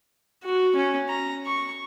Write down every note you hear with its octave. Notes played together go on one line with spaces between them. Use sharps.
F#4
C#4
A#5
C#6